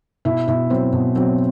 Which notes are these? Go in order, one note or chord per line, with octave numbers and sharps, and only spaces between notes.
B2 E4 E5
B2 E4 E5
F#3 C4 C5
B2
F#3 C4 C5